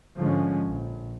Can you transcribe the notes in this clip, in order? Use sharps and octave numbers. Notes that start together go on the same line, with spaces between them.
G#2 D3 F3 G#3 C#4
A#1